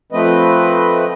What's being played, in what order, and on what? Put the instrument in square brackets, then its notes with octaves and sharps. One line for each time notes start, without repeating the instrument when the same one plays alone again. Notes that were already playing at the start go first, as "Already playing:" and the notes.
[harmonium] F3 A3 C4 B4 D#5